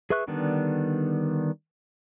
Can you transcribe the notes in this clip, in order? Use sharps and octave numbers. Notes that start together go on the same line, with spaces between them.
G#4 B4 E5 C#6 F#6
D3 D#3 G3 B3 D4